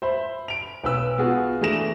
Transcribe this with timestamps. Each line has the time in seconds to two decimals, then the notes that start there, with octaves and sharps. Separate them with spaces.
0.02 C5 E5 B5
0.48 D7 F7
0.84 B1 B4 E6
1.18 B3 F4 F#4 G#4
1.61 E3 A3 D4 G#4 A#6 E7